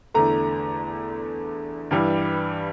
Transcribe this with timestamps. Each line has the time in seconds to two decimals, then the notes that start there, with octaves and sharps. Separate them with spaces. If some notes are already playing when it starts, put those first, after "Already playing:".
0.14 E2 D3 A3 A#5
1.91 G2 E3 G3